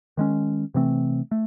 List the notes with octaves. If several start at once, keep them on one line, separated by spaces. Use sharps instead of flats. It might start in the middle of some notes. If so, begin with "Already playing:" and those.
D#3 G#3 C#4
C3 E3 A3 C4
A3